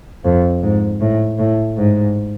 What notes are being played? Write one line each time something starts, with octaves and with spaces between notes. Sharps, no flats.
F2
G#2
A2
A2
G#2